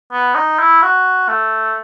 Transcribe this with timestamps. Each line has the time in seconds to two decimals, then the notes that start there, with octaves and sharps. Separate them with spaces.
0.12 B3
0.35 D#4
0.59 E4
0.82 F#4
1.28 A3